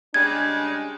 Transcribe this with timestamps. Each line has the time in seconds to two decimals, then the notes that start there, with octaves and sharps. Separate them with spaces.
0.14 C#3 G3 G#3 D4 G#6